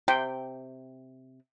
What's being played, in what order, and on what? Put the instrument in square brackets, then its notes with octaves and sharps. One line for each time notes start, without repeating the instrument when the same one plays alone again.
[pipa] C3 [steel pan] G5